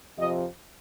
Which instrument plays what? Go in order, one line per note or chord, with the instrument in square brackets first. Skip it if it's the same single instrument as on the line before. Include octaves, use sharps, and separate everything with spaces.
[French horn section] F2 C3 F3 D#5